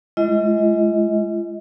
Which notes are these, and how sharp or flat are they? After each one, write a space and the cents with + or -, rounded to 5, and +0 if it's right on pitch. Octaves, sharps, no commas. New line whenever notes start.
G#3 +0 F4 -40 D#5 +30